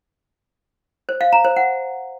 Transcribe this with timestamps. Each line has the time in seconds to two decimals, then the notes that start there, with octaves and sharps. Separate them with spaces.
1.09 C5
1.21 F5
1.33 A#5
1.45 C5
1.56 F#5